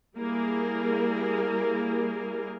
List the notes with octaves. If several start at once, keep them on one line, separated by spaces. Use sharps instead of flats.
G3 A#3 E4 G#4 A#4